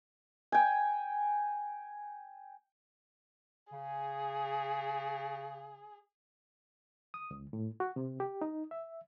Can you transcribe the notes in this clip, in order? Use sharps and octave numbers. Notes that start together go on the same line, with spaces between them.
G5 G#5
C#3 G#4
D#6
C#2
A2
F#4
C3
G4
D#4
E5